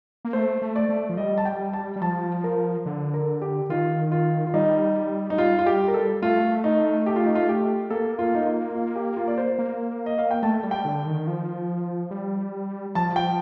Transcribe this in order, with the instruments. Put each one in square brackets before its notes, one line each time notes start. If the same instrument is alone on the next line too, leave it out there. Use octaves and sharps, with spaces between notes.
[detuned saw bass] A#3
[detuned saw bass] A3 [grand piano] C5
[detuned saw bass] A3
[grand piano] D5
[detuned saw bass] A3
F3
[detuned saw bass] G3 [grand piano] D#5
[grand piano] A5
G5
A5
[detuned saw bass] G3
[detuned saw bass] F3 [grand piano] A5
[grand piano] A#4
[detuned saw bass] D3
[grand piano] A#4
G4
[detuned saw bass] D#3 [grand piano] F4
[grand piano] F4
F4
[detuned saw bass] G3 [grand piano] D#4
[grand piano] D#4
[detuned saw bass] G3 [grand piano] F4
[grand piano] F4
G4
A#4
A4
[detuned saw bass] A3 [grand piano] F4
[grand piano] D#4
G4
F4
D#4
F4
G4
[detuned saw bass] A#3 [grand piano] A4
[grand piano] F4
D#4
F4
F4
G4
F4
D5
C5
[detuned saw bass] A#3
[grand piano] D#5
F5
G5
[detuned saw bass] A3 [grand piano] A5
[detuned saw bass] G3
[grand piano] G5
[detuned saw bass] D3
D#3
F3
G3
[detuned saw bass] F3 [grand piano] A5
[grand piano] G5